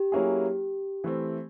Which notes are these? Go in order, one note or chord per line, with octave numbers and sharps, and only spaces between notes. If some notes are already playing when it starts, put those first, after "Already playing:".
Already playing: G4
F#3 A#3 C#4 E4 G#4
E3 A3 C4